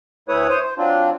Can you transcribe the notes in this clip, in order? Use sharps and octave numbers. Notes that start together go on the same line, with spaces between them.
D2 A3 E4 B4 C#5 D#6
C5 C#5 D#6
C5
F#3 C4 D4 F4